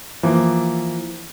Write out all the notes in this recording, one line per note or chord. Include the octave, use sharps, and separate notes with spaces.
E3 F3 A#3